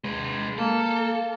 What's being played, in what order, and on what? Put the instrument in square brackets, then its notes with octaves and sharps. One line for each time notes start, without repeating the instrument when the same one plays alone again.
[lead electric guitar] G#3 B4
[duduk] A#3 [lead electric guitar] A4